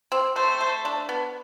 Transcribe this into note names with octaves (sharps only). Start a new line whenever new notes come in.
C4
A3 C5
A3
D4
B3